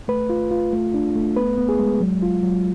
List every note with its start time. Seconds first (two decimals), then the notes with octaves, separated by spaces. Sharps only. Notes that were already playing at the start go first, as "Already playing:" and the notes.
0.08 A3 B4
0.30 F4
0.51 F4
0.73 A3
0.94 D4
1.15 A3
1.36 B3 B4
1.58 B3
1.69 G#4
1.79 G#3
2.00 F#3
2.23 F4
2.43 F#3